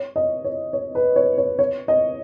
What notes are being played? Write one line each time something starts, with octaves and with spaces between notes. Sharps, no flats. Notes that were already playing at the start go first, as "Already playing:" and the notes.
Already playing: C#5
D#5
C#5
C#5
B4
C#5
C#5
C#5
D#5